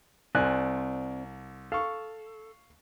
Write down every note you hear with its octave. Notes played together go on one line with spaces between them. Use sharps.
C2 C4 C5 D5 G#5 F#6
A4 F5 C#6